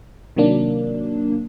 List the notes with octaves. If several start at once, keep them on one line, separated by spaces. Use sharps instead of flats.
C3 D#3 F#3 A#3 D4